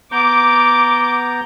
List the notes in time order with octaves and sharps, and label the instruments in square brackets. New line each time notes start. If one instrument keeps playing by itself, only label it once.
[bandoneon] B3 A#5 G6 [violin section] D6